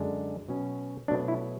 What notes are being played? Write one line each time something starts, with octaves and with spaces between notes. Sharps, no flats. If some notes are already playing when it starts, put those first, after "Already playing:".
Already playing: F#2 D3 G#3 D4
B2 F#3 C#4
B2 F#3 A3 D4
E4